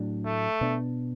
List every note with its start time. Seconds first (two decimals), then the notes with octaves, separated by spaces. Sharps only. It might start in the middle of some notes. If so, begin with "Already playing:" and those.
Already playing: A2 F#3 D4
0.25 A3
0.61 B2 B3 D4